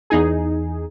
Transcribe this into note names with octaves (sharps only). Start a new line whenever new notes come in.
E2 D#4 G#4